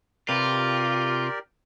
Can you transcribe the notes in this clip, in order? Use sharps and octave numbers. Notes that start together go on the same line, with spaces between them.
C3 F4 G4 A#4 B4 D5